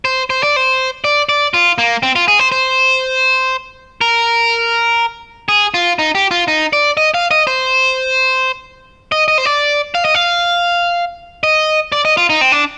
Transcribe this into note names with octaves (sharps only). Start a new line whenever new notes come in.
C5
C5
D5
C5
D5
D5
F4
A#3
C4
F4
G#4
C5
C5
A#4
G#4
F4
D#4
G4
F4
D#4
D5
D#5
F5
D#5
C5
D#5
D#5
C5
D5
F5
D#5
F5
D#5
D5
D#5
F4
D#4
C4
D4